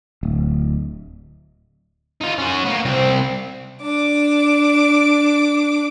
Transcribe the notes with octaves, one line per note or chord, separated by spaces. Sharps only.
D1
D#4 F4
C#4 F#4
A#3 B3
C2 C4
D4 D6